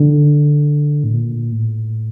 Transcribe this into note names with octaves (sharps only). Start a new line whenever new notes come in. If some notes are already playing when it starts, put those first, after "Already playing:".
Already playing: D3
A2
A#2
A2